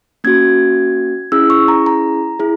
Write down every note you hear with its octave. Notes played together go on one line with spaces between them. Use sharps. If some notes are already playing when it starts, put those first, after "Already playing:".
A#3 C#4 F#4 G#6
C#4 E4 G#4 E6
C#6
A#5
A#5
E4 G#4